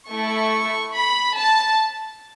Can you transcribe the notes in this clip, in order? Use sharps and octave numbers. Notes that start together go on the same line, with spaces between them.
A3 E4 A4 C#6
B5
A5